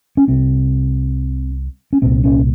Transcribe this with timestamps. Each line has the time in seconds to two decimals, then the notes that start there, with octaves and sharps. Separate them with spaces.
0.17 C#4
0.28 C2 C3 C4
1.93 C#4
2.02 C2 A#2 C4
2.24 C#4